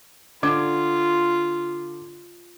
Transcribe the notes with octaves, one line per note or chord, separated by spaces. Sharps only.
D3 F4 D6 G#6